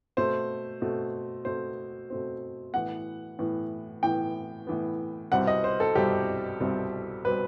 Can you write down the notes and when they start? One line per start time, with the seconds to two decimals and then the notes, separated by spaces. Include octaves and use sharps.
0.17 B2 A3 C4 C5
0.82 B2 A3 C4
1.45 B2 A3 C4 C5
2.10 B2 A3 C4
2.74 A2 E3 B3 F#5
3.39 A2 E3 B3
4.03 A2 E3 B3 G5
4.67 A2 E3 B3
5.32 C2 B2 G3 C4 F#5
5.47 D#5
5.64 C5
5.80 A4
5.95 C2 B2 G3 C4 G4
6.60 C2 B2 G3 C4
7.25 B2 G3 C4 B4